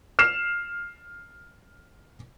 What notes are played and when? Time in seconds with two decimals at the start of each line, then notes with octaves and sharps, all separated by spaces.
0.19 F6 C7 E7